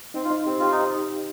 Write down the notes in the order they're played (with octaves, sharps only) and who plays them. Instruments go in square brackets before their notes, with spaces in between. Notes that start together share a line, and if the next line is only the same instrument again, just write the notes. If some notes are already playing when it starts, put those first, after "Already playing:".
[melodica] C4 [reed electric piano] D#4
[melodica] F4
[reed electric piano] D#4
[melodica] C4 [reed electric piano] G4
[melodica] F4 [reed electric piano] G4
[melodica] D#4